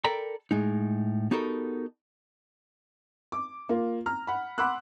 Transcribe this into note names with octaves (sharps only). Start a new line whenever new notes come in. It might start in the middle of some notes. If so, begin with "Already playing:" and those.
A4 A#4 D5 G5 A#5 B5
A2 G#3 D#4
B3 D#4 F#4 G4 A4 A#4
D6
A#3 F4
A#5 F6
F#5 B5
F#5 B5 C6 D6 E6 F#6